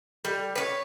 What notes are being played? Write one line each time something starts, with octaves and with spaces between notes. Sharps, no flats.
G3
B4 C#5